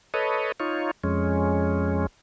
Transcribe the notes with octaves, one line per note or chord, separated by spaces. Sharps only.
A4 B4 C#5 D#5
D#4 F4 C#5
F2 G#3 C#4